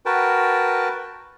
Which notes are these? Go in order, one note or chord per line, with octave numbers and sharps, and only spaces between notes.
F#4 A#4 B4 G5 A5